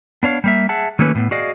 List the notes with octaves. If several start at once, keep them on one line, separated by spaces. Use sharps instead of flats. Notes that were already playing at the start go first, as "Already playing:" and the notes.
B3 D4 C#5 F5
G3 A#3 E5
G#4 E5 F#5 A5
D#3 F#3 A3 A#3 C#4 B4
A2 B3
F#4 G#4 D5 D#5 F5